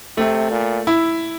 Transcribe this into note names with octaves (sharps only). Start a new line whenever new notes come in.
C3 A3
A#2
E4